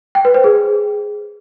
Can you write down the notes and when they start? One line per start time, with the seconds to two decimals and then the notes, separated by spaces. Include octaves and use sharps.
0.15 G5
0.25 B4
0.34 C5
0.44 G#4